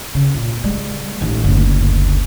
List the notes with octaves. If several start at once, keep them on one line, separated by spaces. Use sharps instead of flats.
C#3
A#2
G3 G#3
A1 D#3
F#1 D2